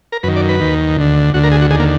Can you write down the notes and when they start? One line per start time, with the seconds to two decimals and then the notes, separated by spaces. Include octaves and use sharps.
0.12 A#4
0.23 F#2 D#3 B4
0.36 D5
0.49 B4
0.60 D#2 D#3
0.97 D2 D3
1.34 D2 D3 F#4
1.43 A#4
1.52 G#4
1.61 F#4
1.70 D#2 D3 G#4
1.80 A#3